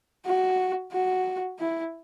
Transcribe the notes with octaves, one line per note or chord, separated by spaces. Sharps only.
F#4
F#4
E4